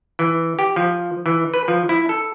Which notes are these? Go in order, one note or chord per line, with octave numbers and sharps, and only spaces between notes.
E3
G4
F3
E3
B4
F3
E4
A4